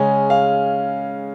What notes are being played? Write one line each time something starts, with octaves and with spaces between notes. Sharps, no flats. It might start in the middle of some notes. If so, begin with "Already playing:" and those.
Already playing: C#3 G#3 C#4 G#5
F5